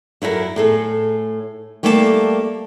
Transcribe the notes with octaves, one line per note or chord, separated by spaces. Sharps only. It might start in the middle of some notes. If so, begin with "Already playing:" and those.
F#2 E4 F4 A4 A#4
A2 G#4 A4
G3 A3 A#3 A4 B4 A5